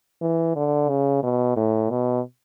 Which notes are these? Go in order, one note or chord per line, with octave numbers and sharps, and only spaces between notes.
E3
D3
C#3
B2
A2
B2